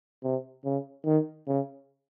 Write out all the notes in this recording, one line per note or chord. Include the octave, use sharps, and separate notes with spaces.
C3
C#3
D#3
C#3